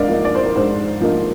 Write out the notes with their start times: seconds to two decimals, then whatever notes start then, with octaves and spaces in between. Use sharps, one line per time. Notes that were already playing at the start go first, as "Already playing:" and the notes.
Already playing: G#2 A#4 D5 D#5 F5
0.08 F3 A#3 D#4
0.25 D5
0.35 C5
0.46 A#4
0.55 G#2 C5
1.01 F3 A#3 D#4